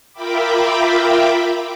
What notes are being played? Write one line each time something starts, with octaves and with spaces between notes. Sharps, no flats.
F4 A#4 E5 G5 B5 D6